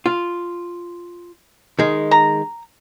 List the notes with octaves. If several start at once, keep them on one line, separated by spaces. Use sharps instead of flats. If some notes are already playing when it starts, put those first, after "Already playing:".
F4
D#3 G#3
A#5